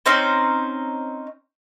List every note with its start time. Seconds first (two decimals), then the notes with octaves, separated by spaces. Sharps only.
0.06 C4 C#4 D#4 C5